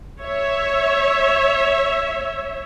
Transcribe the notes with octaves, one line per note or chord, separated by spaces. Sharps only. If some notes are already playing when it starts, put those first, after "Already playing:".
C#5 E5